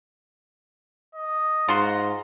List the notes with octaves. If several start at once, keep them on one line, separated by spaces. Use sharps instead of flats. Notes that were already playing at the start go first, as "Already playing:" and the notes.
D#5
G#2 F4 F#4 A#5 C6